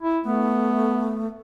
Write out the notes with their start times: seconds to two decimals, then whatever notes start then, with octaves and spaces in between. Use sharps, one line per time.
0.03 E4
0.25 A3 B3